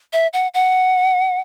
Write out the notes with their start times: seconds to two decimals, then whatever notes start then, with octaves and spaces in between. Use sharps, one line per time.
0.13 E5
0.33 F#5
0.54 F#5